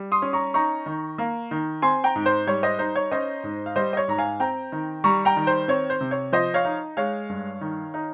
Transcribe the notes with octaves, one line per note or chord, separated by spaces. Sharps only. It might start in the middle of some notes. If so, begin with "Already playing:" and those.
Already playing: G3
C6 D#6
C#4
A#5 C#6
D#4 A#5 C#6
D#3
A#3
D#3
C4 G#5 C6
G5 A#5
G#2
C5
G3 C#5
C5 D#5
D#4 C5
C#5
C#4 C5 D#5
G#2
F5
G3 C5 D#5
D#5
C#5
G#2 A#5
F5 G#5
C4 G5 A#5
D#3
G3 A#5 C#6
G5 A#5
D#3
C5
C4 C#5
C5
C3
C#5
F3 C5 D#5
C#5 F5
D#4
G#3 C#5 F5
G2
D#3
D#4